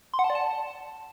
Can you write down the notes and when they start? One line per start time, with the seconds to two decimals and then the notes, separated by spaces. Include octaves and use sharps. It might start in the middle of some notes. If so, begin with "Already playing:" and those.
0.14 C6
0.19 F#5
0.24 A5
0.30 D5
0.35 A5